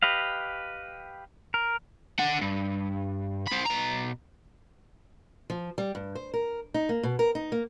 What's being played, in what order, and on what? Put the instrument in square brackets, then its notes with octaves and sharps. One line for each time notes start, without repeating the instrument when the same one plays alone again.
[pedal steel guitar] G4 B4 D#5 F5
A#4
[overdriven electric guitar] D4 F#5
C#2 G2
C4 B5
B2 A#5
[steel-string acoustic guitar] F3
G3
G2
C5
A#4
D#4
A#3
B2
A#4
D#4
A#3